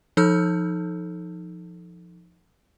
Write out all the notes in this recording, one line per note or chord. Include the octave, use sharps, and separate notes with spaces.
F3 D#4 A4 E6 F6 G6